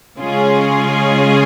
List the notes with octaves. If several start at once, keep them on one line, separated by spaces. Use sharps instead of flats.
C#3 G#3 C#4 F4 G#4